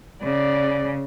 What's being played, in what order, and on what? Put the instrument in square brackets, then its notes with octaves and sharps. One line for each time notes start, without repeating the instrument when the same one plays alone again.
[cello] C#3 [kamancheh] D5